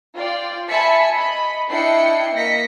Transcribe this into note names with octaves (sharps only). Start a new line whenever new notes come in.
F4 D5 G5
E5 G#5 A5 B5 B6 C#7
D#5 B5
D4 E4 D#5 G5 C7 C#7
A#3 D#5 A#6 B6 C#7